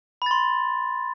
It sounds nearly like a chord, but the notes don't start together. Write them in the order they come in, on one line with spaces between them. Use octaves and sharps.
B5 A6 C6